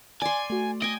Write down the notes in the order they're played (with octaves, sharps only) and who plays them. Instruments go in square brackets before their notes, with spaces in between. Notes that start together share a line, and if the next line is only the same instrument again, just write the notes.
[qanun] D5 C6 [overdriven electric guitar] G#5
[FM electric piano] A3 F#4
[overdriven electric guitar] D#5 [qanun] G5 G#5